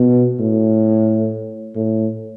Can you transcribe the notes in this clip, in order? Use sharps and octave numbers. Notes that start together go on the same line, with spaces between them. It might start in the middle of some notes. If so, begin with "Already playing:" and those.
Already playing: B2
A2
A2